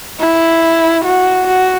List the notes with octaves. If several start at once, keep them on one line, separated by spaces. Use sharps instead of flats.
E4
F#4
F#4